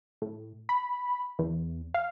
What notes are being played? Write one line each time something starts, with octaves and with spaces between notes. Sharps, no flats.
A2
B5
E2
F5